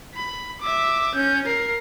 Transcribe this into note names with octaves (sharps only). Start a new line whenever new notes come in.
B5
E5 D6
C#4 G6
A#4 C7